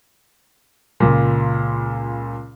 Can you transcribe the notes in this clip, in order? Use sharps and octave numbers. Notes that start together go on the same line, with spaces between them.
C#2 A#2